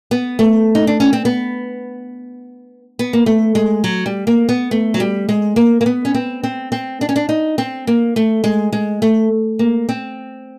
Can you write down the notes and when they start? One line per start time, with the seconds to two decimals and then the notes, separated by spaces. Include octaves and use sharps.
0.11 B3
0.39 A3
0.75 D#4
0.87 D4
1.00 C#4
1.13 C4
1.25 B3
2.99 B3
3.13 A#3
3.26 A3
3.55 G#3
3.84 F#3
4.06 G3
4.27 A#3
4.49 B3
4.71 A3
4.94 F#3
5.00 G3
5.29 G#3
5.56 A#3
5.81 A#3
5.86 B3
6.05 C#4
6.15 C4
6.44 C4
6.72 C4
7.01 D4
7.09 C#4
7.16 D4
7.29 D#4
7.58 C4
7.87 A#3
8.16 A3
8.44 G#3
8.73 G#3
9.02 A3
9.59 A#3
9.89 C4